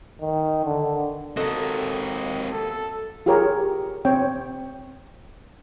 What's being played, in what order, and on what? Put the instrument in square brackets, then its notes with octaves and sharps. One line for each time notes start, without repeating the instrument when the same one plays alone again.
[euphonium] D#3
D3
[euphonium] D#2 [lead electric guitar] C4 A#4 [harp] F#4 A4 D#5
[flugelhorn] A4
[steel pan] F4 G4 G#4 A#4 C#5
C4 C#5 G5